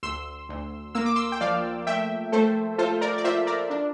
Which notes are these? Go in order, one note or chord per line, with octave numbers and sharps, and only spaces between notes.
D2 C6 E6
D2
A#3 E6
D6
C6 E6
G5
F3 D5 F5
A3 E5 G5
A3 A4 C5
F4 A4 C5
A#4 D5
D5
F4 C5 E5
A#4 D5
D4